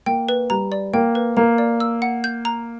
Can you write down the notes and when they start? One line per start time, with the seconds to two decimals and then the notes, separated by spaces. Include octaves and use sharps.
0.06 A#3 G5
0.29 B4
0.50 G3 A#5
0.72 D5
0.94 A#3 G5
1.15 B4
1.37 A#3 A#5
1.58 D5
1.80 E6
2.02 F#5
2.24 G6
2.45 A#5